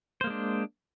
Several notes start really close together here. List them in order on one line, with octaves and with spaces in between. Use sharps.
C5 A#3 G#3 D4